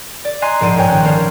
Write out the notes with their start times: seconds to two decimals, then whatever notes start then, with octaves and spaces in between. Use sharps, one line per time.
0.25 D5
0.42 D#5 G#5 A#5 C6 F#6 C7
0.61 A#1 G#2 D5 D7 D#7
0.76 G2 A#4 C#5 G5 G#5
0.88 D#3 C#4 F#6
1.03 A#3 C#4 D4 A#4 C5